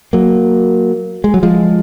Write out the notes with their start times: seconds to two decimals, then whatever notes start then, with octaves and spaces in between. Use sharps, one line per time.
0.13 F#3 A#3
1.24 G#3
1.34 F#3
1.43 F3 G#3